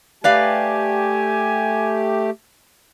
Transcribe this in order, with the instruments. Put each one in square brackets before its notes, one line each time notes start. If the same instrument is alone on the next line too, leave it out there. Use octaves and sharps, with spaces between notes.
[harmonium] A3 G4 [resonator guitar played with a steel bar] B4 D5 F5 [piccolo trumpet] G#5